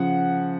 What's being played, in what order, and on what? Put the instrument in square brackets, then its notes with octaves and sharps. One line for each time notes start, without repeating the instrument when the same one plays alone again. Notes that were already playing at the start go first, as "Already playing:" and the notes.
Already playing: [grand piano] C#3 F3 F#5